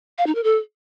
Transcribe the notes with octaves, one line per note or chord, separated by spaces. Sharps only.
F5
D#4
A#4
A4